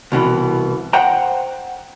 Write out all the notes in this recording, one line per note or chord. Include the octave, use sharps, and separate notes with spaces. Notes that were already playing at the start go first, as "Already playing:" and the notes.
C2 B2 D#3 E3
C5 F#5 G5 A#5